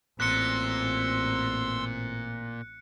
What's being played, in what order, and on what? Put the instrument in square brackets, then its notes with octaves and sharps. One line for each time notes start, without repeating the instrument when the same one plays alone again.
[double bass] A1 C4 [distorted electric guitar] A#2 [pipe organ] C6 E6 [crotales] F#6 C#7